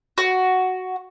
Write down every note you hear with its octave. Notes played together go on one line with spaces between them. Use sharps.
F#4